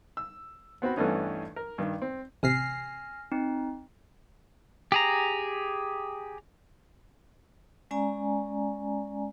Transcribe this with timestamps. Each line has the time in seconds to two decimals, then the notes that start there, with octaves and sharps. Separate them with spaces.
0.17 E6
0.82 B3 C4 F#4 B5
0.97 G2 E3 A3 B3 C#4 D#4
1.56 A#4
1.78 G2 D#3
2.02 C4
2.43 A1 C3 G#5 F6 A#6 C7
3.32 C4 D#4
4.92 G4 G#4 A#5
7.91 G#3 C#4 D5 G#5 A#5